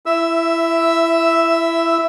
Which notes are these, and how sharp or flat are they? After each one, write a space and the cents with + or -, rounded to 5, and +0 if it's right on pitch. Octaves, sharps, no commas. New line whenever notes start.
E4 +20 E5 +0 E6 +0